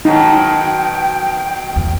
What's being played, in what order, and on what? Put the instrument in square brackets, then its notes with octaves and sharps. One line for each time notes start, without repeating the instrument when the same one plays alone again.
[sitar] B2 D#3 F#3 [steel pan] D#4 [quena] G5
[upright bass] E2